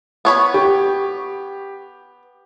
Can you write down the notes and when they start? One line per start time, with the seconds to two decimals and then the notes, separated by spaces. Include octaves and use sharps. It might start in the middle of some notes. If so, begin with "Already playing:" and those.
0.25 B3 C#5 B5
0.54 G4